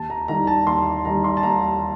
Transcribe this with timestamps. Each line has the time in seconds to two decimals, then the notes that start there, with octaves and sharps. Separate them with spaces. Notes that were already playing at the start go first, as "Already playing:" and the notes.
Already playing: D#2 A5
0.10 A#5
0.28 D#3 G3 A#5
0.47 A5
0.67 D#2 C6
1.05 D#3 G3 A#5
1.24 C6
1.37 A5
1.43 D#2 A#5